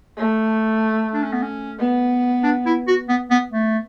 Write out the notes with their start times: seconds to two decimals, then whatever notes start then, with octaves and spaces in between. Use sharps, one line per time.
0.17 A3
1.14 D4
1.23 C#4
1.33 B3
1.42 C#4
1.79 B3
2.44 D4
2.66 E4
2.88 F#4
3.09 B3
3.31 B3
3.52 A3